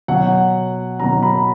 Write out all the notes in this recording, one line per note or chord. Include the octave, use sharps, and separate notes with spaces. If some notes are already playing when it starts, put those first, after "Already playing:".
B2 F#3 F#5
B2 F#3 A#5
B5